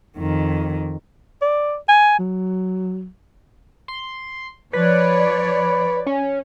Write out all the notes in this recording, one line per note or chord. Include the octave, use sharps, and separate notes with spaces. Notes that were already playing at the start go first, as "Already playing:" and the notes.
F2 D#3
D5
G#5
F#3
C6
F3 B4 C#5 D5
C#4